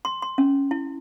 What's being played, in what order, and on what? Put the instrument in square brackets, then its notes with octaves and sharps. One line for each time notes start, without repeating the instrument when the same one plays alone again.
[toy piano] C6
C6
C#4
E4